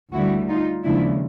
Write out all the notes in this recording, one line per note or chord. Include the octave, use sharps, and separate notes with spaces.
D2 D3 G3 E4 F#4
D#4 F4
D#2 C#3 F3 G#3 D4 E4